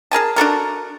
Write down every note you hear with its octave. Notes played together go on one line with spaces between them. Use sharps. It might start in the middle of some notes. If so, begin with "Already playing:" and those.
G#4 A#4 G#5 A5
D4 F#4 A4 A#4